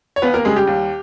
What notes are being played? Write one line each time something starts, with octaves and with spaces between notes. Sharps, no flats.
C#5
D#2 B3 B4
A#3 A#4
C#3 G3 G#3 G#4
G3 G4
D#2